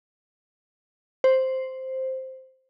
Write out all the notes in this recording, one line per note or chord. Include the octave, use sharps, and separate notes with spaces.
C5